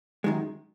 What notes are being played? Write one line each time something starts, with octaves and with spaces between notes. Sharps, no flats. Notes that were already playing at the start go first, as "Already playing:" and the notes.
F#2 D#3 G#3